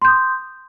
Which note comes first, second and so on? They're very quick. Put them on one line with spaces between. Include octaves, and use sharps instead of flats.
C6 G6 D#6 D6